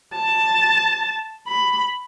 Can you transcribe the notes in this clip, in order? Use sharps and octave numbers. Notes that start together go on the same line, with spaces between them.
A5
B5